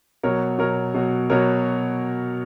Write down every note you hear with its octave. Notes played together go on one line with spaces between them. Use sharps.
B2 F#3 A#4 C#5
B2 F#3 A#4 C#5
B2 F#3
B2 F#3 A#4 C#5